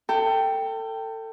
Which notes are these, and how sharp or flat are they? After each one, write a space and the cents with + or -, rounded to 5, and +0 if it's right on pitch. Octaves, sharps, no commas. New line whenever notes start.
A4 +30 G5 +0